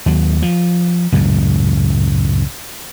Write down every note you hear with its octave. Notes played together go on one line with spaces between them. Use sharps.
D#2 F#3
F3
C#2 F#2 A2